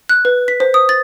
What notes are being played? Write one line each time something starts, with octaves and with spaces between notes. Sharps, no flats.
F#6
B4
B6
C5
D#6
A6